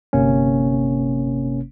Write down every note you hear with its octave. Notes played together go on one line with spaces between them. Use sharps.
G1 C3 A#3 C#4